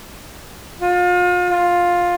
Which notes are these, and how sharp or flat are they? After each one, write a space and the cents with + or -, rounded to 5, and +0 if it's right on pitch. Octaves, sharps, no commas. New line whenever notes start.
F4 +35
F4 +10